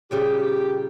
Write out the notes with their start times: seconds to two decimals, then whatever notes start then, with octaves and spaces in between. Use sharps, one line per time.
0.11 A#2 C#3 G3 G4